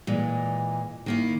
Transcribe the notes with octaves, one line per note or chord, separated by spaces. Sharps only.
A#2 E3 G#3
D#3 A#3 E4